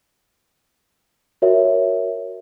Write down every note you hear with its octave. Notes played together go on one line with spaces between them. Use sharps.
F#4 A#4 C#5 E5